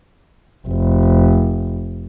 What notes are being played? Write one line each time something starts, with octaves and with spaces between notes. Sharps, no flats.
F1